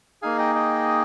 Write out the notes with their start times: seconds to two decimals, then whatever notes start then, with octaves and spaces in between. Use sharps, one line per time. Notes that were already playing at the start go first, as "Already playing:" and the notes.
0.22 A#3 D#4 G#4 F5 G#5
0.38 D#5 G5
0.55 D#5 G5